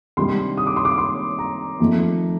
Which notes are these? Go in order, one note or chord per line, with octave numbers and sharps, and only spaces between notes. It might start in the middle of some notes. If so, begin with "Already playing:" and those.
C3 D#3 G3 D4 C6
D#6
D6
C6
D6
C6
A#5
F2 D#3 A3